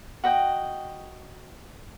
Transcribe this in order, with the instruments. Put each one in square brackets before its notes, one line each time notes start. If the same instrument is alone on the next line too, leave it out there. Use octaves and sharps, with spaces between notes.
[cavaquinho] F#4 D#5 G5